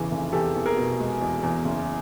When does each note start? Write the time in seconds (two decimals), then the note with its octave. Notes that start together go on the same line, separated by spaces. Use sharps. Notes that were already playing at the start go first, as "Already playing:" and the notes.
Already playing: F1 E2 C#3 E3
0.11 F1
0.33 E2 G4 A4
0.55 E2
0.66 G#4 A#4
0.77 B2
1.00 G#3
1.21 E2
1.43 E2
1.65 F#1